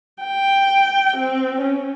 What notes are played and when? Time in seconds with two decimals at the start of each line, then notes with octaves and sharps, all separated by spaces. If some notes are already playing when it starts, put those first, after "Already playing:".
0.23 G5
1.17 C4
1.61 C#4